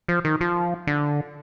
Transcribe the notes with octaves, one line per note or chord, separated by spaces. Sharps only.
F3
D#3
F3
D3